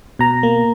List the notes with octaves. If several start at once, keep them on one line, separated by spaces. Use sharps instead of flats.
B2 A#5
A#3